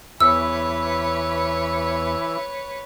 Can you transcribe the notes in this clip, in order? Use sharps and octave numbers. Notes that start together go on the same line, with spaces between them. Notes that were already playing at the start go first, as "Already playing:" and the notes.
E2 E3 E4 B4 C#5 E6